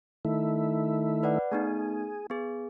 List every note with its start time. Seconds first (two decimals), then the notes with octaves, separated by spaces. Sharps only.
0.25 D#3 A3 E4
1.23 B4 D5 F#5
1.52 A3 B3 D#4 G#4
2.30 B3 G#4